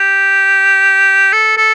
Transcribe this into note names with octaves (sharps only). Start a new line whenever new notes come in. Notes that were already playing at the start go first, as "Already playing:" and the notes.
Already playing: G4
A4
A4